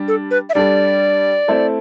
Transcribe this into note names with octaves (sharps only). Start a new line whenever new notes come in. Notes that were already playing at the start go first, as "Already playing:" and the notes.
Already playing: G3 D4
A4
B4
E5
G3 D4 A4 D5
A3 C4 E4 A4